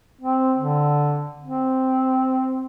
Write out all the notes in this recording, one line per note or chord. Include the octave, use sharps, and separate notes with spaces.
C4
D3
C4